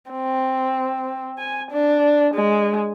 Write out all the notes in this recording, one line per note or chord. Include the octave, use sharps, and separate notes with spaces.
C4
G#5
D4
G#3